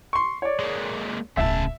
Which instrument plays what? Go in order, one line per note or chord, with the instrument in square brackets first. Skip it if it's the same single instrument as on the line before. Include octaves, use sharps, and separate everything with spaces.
[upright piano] C6 C#6
C#5 D5
[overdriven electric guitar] G#3 A#3
[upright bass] D1 B1 [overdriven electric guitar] C#3 A5 [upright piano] E5